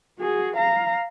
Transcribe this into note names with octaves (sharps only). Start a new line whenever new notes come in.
F#4 G#4
F5 A#5